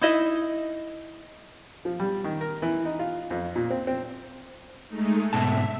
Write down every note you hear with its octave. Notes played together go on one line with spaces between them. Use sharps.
D#4 E4 D#5 E5
F3
G3
D#3
A#4
E3
D#4
F4
F2
A#2
C4
C4
G#3 A3 D#4
G#2 B2 E5 A5